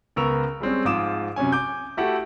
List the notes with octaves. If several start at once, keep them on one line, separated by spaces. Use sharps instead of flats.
C#2 B3 A#4 C#6 E6 F7
G3 G#3 C4 C#4
G#2 F3 F4 D6 D#6 E7
F#2 C3 C#4 G#5
G#5 D6 G6
A3 E4 F#4 G4 A4 F#5